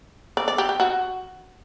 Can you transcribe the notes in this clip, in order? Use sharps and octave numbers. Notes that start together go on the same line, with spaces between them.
D5
D5
G4
G4
F#4